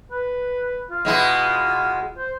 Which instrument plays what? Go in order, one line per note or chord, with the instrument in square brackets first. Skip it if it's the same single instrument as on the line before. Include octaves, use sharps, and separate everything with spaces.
[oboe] B4
F4
[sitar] B2 G#3 E4
[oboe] C5